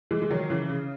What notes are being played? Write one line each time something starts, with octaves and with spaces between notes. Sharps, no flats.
E3 G#3
G#3
D#3 F#3
C#3 E3
C#3